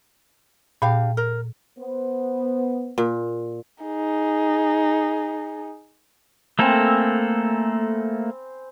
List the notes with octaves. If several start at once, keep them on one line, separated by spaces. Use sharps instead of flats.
A#2 D4 G4 F5
A#4
B3 C5
A#2
D#4 G#4
A3 A#3 C4 A4 G#5 B5